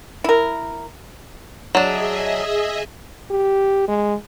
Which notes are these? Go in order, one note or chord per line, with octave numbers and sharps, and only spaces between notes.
E4 A#4
F#3 D4 G#4 D#5 E5
G4
G#3